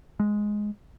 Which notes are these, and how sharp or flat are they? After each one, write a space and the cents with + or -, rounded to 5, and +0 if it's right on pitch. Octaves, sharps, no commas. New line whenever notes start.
G#3 +5